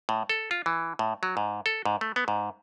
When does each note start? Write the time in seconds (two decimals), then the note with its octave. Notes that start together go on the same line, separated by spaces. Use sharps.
0.09 A2
0.29 A4
0.51 F4
0.66 E3
0.99 A2
1.23 F#3
1.37 G#2
1.66 A4
1.85 G#2
2.01 A3
2.16 B3
2.28 G#2